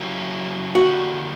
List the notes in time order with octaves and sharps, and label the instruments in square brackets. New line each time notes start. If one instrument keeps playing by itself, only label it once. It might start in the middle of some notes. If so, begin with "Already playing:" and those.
Already playing: [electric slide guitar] C#3 F#3 A#3 E4 G4
[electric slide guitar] D3 A#3 E4 G4 [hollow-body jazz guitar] F#4